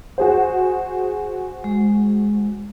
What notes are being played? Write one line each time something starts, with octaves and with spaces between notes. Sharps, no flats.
F#4 G#4 C5
G#3